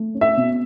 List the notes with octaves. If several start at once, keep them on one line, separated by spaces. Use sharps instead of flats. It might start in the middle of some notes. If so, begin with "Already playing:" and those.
Already playing: A3
C#4
E5
B2